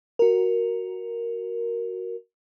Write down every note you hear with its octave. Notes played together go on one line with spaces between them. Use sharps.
F#4 A#4